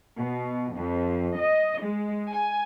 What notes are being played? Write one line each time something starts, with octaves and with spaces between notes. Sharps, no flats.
B2
F2
D#5
G#3
G#5